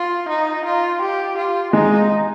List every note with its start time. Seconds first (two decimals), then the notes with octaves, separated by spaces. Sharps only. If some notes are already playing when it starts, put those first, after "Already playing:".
Already playing: F4
0.29 D#4
0.65 F4
1.02 G4
1.37 F4
1.73 G#3 D#4